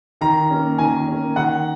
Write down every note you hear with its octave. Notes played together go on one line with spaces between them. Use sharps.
D#3 A#5
A#3 C#4
D#3 G#5
A#3 C#4
D#3 F#5